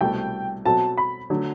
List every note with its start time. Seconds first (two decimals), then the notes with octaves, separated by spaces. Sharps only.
0.01 C2 B2 A3 G5
0.65 B2 F#3 C4 F#4 A4 A5
0.97 B5
1.30 D3 F#3 A3 D4